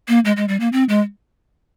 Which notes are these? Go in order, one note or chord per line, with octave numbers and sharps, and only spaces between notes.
A#3
G#3
G#3
G3
A#3
C4
G#3